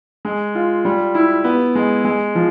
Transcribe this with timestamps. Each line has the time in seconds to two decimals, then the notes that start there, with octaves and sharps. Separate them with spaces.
0.25 G#3
0.55 F4
0.85 G3
1.15 E4
1.44 B3
1.75 G#3
2.05 G#3
2.35 F3